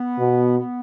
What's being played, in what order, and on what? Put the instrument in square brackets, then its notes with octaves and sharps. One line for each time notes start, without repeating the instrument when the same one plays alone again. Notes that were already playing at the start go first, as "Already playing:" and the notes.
Already playing: [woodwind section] B3
[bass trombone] B2
[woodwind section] B3